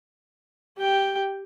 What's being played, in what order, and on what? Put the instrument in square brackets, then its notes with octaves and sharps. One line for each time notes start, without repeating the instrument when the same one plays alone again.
[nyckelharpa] G4 G5